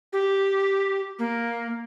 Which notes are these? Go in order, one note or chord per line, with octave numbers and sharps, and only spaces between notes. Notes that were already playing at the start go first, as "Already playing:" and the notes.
G4
A#3